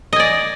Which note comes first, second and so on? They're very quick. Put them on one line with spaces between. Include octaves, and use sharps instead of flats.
D#5 G#5 D5